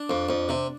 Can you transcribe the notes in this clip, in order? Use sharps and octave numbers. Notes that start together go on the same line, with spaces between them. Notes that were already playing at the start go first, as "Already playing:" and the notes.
Already playing: D4
F2
F2
C3